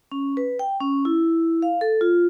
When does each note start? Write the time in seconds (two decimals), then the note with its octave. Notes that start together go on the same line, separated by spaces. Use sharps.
0.12 C#4
0.37 B4
0.59 G5
0.81 C#4
1.05 E4
1.62 F5
1.81 A4
2.01 F4